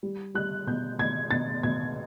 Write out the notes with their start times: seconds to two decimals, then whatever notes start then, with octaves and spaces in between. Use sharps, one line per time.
0.03 G3
0.34 G3 F#6
0.67 B2 G6
0.98 B2 G#6
1.31 B2 A6
1.63 B2 G#6